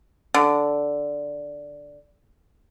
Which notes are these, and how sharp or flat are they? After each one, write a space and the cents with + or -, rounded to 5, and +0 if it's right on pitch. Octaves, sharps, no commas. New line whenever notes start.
D3 -5